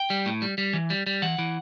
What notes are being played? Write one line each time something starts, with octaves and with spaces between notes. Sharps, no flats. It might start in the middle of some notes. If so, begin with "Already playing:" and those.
Already playing: G5
G3
A2
G3
G3
E3
G3
G3
E3 F#5
E3